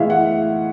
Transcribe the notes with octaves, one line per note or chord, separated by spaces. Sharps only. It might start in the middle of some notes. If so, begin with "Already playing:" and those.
Already playing: A2 E3 G#3 E5 F5
F#5